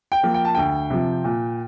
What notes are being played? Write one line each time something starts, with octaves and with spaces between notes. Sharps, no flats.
G5
F3 A#3
G5
A5
D2 G5
C3 F3
A#2